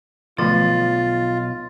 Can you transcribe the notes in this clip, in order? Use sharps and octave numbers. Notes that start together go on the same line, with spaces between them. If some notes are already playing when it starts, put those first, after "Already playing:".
B1 D3 F3 A3 F4 C6 A6